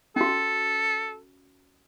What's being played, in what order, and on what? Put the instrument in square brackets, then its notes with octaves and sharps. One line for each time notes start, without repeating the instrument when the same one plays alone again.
[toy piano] C#4 F#4 [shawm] A4